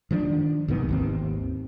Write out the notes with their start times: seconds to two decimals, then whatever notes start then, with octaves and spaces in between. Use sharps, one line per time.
0.11 D#3 F3 A3 D4
0.68 C2 G#2 D#3 B3
0.89 G#1 D#2 C4